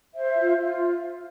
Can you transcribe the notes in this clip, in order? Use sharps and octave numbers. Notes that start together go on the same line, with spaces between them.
C5 E5
F4
F4